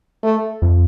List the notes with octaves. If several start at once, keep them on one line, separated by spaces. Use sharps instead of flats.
A3
F2